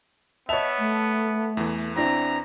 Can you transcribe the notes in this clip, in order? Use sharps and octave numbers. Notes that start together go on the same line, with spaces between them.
B3 C#5 D#5 E5 A5 F7
A3
E2 E3
C4 D4 E4 A#5